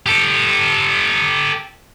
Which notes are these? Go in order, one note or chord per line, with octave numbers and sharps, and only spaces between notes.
G4 A4